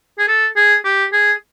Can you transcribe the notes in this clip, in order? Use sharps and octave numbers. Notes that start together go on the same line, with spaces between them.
G#4
A4
G#4
G4
G#4